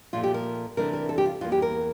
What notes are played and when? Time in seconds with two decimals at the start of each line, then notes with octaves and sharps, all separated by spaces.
0.13 A#2 F3 A3 F4
0.23 G4
0.34 A#4
0.77 C3 E3 A3 D4 A#4
0.93 A#4
1.09 A4
1.18 G4
1.26 F4
1.41 E2 E3 A#3 F4
1.52 G4
1.62 A#4